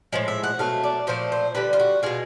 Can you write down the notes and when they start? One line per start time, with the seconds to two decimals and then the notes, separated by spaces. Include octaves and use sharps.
0.13 A2 F3 G#3
0.28 E5
0.44 F#5
0.59 B2 F#3 A3 F5
0.83 D5
1.07 A#2 F3 A3 C5
1.32 C5
1.55 D3 G3 B4
1.73 F4
1.80 F#4
2.03 B2 G#3 F4